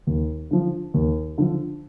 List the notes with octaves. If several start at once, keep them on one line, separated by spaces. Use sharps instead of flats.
D#2
D3 F3
D#2
D3 F3